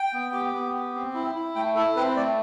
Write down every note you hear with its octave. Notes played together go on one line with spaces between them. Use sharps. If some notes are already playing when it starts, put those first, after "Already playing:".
Already playing: G5
B3
G4
B3
G4
C4
E4
E4
A3 G5
E4 A4
C4 B4
A3 D5